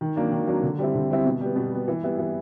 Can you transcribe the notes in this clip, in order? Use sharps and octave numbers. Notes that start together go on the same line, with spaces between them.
D#3
F#3 A#3 D4
D#3
F#3 A#3 D4
D3
G3 C4 E4
D3
G3 C4 E4
B2
G3 B3
B2
G3 B3
E3
G3 B3 E4
E3